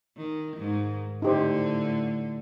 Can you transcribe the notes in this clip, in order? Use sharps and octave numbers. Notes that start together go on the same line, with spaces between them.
D#3
G#2 D#3
A2 D3 D#4 G4 C5